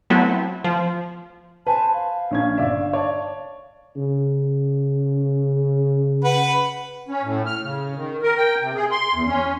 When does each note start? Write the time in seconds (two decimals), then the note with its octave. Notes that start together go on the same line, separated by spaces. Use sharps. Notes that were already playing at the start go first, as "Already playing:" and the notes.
0.10 F#3 A3 B3 C4 E4 F#4
0.64 F3
1.67 B4 C5 G#5 A5
1.94 F5
2.31 A#1 C#4 G#6
2.57 G1 D5 E5
2.93 C#5 D5 A5
3.96 C#3
6.24 B4 F#5
7.08 C#4
7.23 A2
7.46 F6
7.63 C#3
7.96 D#3
8.22 A#4
8.37 G5
8.61 C3
8.75 G#4
8.91 C6
9.14 E2
9.27 C#4